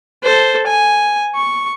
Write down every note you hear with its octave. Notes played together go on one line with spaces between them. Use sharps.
A4 C5
G#5
C#6